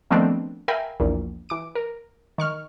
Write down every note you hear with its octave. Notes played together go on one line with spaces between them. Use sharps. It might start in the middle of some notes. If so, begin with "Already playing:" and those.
D#3 F3 A3 B3 C4 D4
A#4 E5 F5 G5 G#5 B5
A#1 E2 A#2
E3 D6 D7
A#4
D#3 C#6 F6